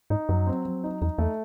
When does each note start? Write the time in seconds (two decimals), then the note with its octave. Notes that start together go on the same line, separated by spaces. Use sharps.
0.10 G#2 D#4
0.29 F#2 F#3
0.47 C4
0.65 F#3
0.84 D#4
1.01 E2 D#4
1.18 E2 A3